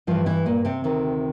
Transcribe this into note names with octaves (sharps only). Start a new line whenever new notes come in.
G2 E3 F3 F4
E3 E4
A#2 A#3
C3 C4
D2 C3 D#3